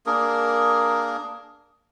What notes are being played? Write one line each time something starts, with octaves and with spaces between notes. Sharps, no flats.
A#3 D4 G#4 A#4